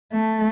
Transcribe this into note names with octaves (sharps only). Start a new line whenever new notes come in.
A3